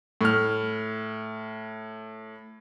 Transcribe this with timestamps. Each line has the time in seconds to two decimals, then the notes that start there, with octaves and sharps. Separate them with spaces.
0.21 A2 F6